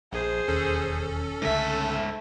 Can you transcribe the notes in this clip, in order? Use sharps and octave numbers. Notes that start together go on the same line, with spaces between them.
A#1 G#4 C5
E1 D#2 C#4 A4
C#2 G#2 D3 G#3 A3 E5